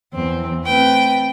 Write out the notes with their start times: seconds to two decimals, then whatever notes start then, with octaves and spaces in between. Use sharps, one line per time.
0.14 E2 E3 C4
0.65 A3 C4 B4 G5